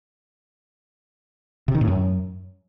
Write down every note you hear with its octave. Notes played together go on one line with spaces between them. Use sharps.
C3
D#3
A2
F#2